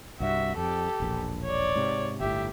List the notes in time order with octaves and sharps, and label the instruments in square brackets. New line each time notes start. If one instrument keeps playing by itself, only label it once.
[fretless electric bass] C2 G2 [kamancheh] F#4 E5
[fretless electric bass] F2 [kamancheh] G4 A4
[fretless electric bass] E1 A#1
[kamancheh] C#5 D5
[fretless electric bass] G#2 C3
[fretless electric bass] G1 A2 [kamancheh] G4 E5